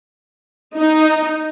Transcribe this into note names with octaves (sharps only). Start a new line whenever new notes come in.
D#4